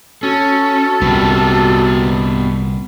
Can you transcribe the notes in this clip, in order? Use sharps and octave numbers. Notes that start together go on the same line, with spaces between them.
C#4 F#4 A4
C2 A#2 B3 G4